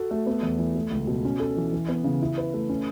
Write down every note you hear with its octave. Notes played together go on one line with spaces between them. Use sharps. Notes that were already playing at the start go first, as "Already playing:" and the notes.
Already playing: F#4 A4
A3
B3
E2
E3
A3
C#2
B2
C#4
A4
E3
E3
B3
C#3
E4
B4
A3
C#4